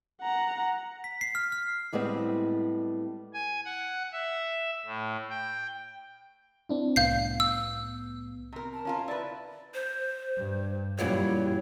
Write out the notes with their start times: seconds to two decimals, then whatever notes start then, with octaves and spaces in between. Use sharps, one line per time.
0.22 F#5 A#5
1.04 B6
1.21 C7
1.35 F6
1.52 F6
1.93 A2 G3 G#3 B3 C4
3.34 G#5
3.65 F#5
4.12 E5
4.86 A2
5.30 G5
6.69 C4 D4 E4
6.96 C2 A2 B3 F5 G6 C7
7.40 E6
8.52 C3 A#4
8.74 A5
8.85 C#4 F4 A#4
9.08 E4 B4 D5
9.74 C5
10.37 G2
10.99 F#2 A#2 E3 F#3 G3 C#5